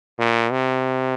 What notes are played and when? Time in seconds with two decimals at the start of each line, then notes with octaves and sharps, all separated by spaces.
0.19 A#2
0.51 C3